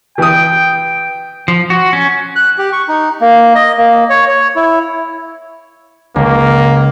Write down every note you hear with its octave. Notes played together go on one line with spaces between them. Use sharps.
E3 G5 D#6
F3
F#4
C#4
F#6
G4
C#6
D#4
A#3
D#5
A#3
C#5
C#5
E4
C#2 A#3